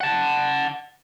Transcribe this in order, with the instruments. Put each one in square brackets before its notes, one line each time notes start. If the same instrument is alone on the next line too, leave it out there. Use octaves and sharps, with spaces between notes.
[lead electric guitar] F#5 A5